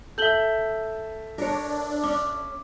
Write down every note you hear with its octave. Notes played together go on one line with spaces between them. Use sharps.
A4 E5 G6 F#7 G7
D4 A#4 C#5
C#4 D6